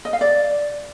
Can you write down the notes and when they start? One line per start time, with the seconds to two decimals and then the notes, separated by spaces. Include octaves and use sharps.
0.05 D#5
0.13 F5
0.21 D5